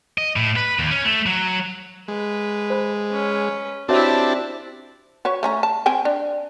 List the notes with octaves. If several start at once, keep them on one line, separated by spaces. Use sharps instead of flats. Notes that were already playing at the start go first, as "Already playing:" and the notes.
D#5
A2
B4
D#2
C#4
A3
F#3
G#3 B4
C5 B5
C#4 B4
C4 D4 E4 F#4 G4 C#5 E5 A5
F#4 B4 C#5
A3 C#4 A#5
A5
C4 G5 G#5
D4